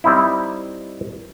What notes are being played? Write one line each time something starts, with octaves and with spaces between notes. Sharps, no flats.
G3 C4 D#4 E4